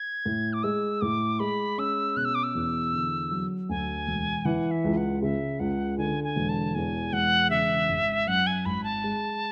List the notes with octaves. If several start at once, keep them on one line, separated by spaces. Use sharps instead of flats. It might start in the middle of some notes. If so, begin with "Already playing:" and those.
Already playing: G#6
A2
D6
G#3 E6
A2 D6
G#3 B5
C#4 E6
B2 F#6
E6
D6
E6
E2
D3
F#3
D2 G#5
E1
E3 F#5
E5
C#2
F#5
C#3 E5
C#2 F#5
D3 G#5
G#5
E1
A5
E2 G#5
E1 F#5
C#3 E5
G#1
F#2 F#5
G#5
G#1 B5
A5
G#3